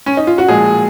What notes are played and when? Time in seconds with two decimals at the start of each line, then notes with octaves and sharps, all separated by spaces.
0.06 C#4
0.17 D#4
0.27 F4
0.38 F#4
0.48 A#2 F3 G#3 G#4